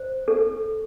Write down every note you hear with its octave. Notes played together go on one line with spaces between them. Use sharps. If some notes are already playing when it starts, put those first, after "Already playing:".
Already playing: C5
A4